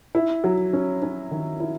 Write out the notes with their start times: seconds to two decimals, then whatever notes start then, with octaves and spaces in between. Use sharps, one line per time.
0.15 E4
0.44 F#3
0.73 C#4
1.02 C#4
1.31 D#3
1.60 E4